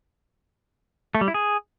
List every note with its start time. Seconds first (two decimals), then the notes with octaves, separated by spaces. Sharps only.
1.15 A3
1.21 G3
1.28 E4
1.34 G#4